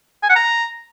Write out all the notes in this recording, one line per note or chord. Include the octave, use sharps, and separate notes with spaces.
G#5
F#5
A#5